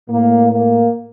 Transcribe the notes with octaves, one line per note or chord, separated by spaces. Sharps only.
A2 A#3
A#3